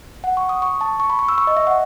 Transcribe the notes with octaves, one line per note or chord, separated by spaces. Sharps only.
F#5
C#6
D#6
C#6
A5
C#6
B5
C#6
E6
C#6
D#5
E5
F#5